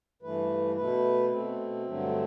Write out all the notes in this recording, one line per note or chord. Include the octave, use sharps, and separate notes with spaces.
G2 E3 A3 B4
B2 A3 B4
B2 A3 C4
G2 D3 F#3 A3